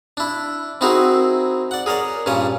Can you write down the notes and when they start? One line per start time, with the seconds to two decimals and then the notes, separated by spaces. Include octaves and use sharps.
0.17 D4 E4
0.81 C4 D#4 E4 F#4 G#4 A#4
1.71 D5 F#5
1.86 G#4 A#4 C#5 D5
2.26 G2 A#2 C#4 C#5 G#5